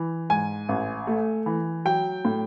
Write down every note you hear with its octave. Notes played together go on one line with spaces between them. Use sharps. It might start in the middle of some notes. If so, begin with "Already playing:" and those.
Already playing: E3
G#2 G#5
A1
A3
E3
F#3 G5
A2